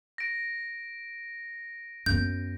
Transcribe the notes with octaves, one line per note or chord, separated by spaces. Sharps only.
A#6 D7
F#2 B3 G6